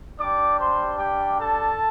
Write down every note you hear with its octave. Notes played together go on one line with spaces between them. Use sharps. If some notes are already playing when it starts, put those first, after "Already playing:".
G3 D4 G4 D5 D6
C5 C6
G4 G5
A4 A5